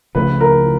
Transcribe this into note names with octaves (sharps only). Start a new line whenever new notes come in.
C#2 C#3 F3 A3 B4
A#4